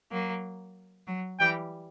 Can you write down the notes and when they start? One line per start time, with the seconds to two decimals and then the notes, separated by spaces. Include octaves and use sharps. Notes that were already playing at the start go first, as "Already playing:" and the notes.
0.11 F#3 A#3
1.07 F#3
1.40 E3 G3 G5